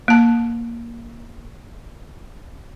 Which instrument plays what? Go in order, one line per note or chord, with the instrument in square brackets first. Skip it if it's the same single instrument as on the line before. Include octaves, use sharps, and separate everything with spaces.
[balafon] A#3 A5